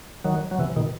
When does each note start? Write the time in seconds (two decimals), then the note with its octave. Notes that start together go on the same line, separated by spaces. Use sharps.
0.24 D#3 F#3
0.51 F#3
0.58 C3 E3
0.76 B2 D#3